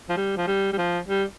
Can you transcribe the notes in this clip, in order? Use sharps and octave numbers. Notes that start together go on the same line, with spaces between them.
F3
G3
F3
G3
G3
F3
G3